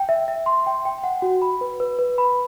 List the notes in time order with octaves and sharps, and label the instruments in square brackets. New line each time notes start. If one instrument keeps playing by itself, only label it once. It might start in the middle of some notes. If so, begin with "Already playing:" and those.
Already playing: [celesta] G5
E5
E5
C6
G5
G5
F#5
F#4
B5
B4
B4
B4
B5